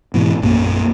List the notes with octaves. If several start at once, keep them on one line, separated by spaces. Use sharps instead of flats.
G#2 B2 E3
A#1 F#2 A#3